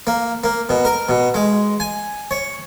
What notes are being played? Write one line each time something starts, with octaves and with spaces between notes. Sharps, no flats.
A#3
A#3
B2
A#4
B2
G#3
G#5
C#5